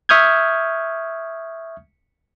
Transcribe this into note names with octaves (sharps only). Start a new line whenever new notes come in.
E5 C#6 D#6 F6 G6 G#6